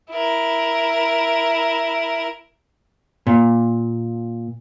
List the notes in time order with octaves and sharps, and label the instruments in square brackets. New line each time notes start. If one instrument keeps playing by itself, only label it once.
[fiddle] E4 A#4
[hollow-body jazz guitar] A#2